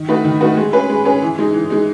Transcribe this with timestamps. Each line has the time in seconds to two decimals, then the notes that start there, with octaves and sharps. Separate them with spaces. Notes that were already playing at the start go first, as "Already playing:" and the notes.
Already playing: D#3
0.08 A3 D#4 F#4 B4
0.25 D#3
0.41 A3 D#4 F#4 B4
0.57 G#3
0.73 C#4 G#4 B4
0.90 G#3
1.05 C#4 G#4 B4
1.22 E3
1.39 G#3 D#4
1.54 E3
1.70 G#3 D#4